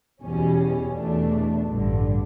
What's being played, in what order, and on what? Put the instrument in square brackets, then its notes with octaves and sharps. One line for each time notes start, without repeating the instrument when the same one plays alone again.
[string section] E2 B2 G3 C#4
E2 B2 A3 D4
A1 G2 D3